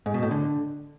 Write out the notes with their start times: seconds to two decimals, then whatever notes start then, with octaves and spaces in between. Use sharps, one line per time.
0.06 G#2
0.14 B2
0.23 A2
0.31 D3